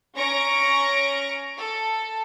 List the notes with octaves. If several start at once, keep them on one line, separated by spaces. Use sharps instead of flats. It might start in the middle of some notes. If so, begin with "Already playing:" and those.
C#4 A#5 C#6 A#6 D7
A4